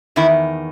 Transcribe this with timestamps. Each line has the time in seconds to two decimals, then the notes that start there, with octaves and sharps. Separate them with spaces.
0.16 E2 D#3 E4